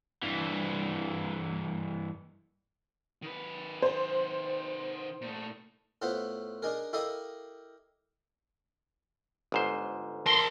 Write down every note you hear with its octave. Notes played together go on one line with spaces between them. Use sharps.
G2 E3
D#3 B4
C5
A#2 A3
A2 B3 F4 B4 C5
D4 D#4 G#4 A#4
E4 G4 A4 A#4 D#5 F5
G1 G#2 C5
A#4 A5 C6